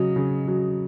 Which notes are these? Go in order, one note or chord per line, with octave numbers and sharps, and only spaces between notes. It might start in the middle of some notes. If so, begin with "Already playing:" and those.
Already playing: C#3 F#3 D#5
C#3
F#3